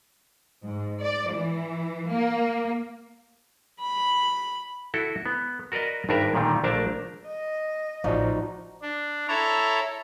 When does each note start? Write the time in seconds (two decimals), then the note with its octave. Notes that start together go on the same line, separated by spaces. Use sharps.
0.63 G#2
1.02 D5
1.31 E3
2.10 A#3
3.81 B5
4.94 E4 F#4 A4
5.26 B3
5.72 F#4 A#4 B4 D5 D#5
6.09 G#1 G2 D4 A#4 B4 E5
6.35 A#2 D3 D#3 G3
6.64 A#1 A3 D4 A#4 A5
7.27 D#5
8.04 A1 F3 D#4 F#4 D5 A#5
8.82 D4
9.28 E4 A4 C#5 A#5